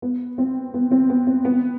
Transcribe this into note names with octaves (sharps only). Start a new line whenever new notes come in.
B3
C4
B3
C4
B3
C4
B3